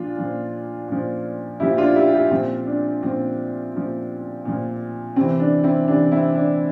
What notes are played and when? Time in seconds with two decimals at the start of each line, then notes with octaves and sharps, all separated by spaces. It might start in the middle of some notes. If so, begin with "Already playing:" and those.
Already playing: A#2 F3 D4 F4
0.17 A#2 F3
0.88 A#2 F3
1.60 A#2 F3 E4 G4
1.77 D4 F4
1.96 E4 G4
2.14 E4 G4
2.31 A#2 F3 C4
2.67 D4
3.02 A#2 F3 C4
3.74 A#2 F3
4.45 A#2 F3
5.16 C3 C4
5.21 E3
5.40 D4
5.64 C4 E4
5.88 C3 E3 D4
6.12 C4 E4
6.35 D4